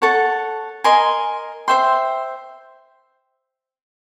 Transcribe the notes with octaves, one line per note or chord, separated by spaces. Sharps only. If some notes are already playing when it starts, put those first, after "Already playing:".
A4 C#5 F#5 A5
A#4 D#5 G#5 C6
C5 E5 G5 C6